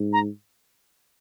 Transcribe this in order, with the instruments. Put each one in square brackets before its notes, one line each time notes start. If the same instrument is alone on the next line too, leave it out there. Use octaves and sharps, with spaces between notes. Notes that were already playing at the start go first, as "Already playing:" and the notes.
Already playing: [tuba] G#2
[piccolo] A#5